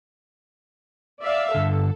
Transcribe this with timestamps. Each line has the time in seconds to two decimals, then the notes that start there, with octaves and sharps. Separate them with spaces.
1.23 D5 E5 F5
1.55 G2 D3 A4